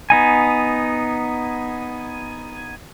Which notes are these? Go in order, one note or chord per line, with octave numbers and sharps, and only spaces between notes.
B3 D#4 G#5